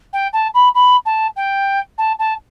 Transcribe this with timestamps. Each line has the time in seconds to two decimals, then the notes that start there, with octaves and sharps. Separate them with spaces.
0.13 G5
0.33 A5
0.54 B5
0.75 B5
1.05 A5
1.36 G5
1.98 A5
2.19 A5